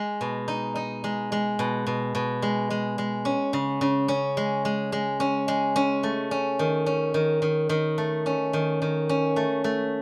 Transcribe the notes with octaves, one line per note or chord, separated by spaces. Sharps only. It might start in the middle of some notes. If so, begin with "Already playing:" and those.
Already playing: G#3
B2
D#4
D#4
G#3
G#3
B2
B2
B2
G#3
G#3
G#3
C#4
C#3
C#3
C#4
G#3
G#3
G#3
C#4
G#3
C#4
A3
C#4
D#3
C#4
D#3
D#3
D#3
A3
C#4
D#3
D#3
C#4
A3
A3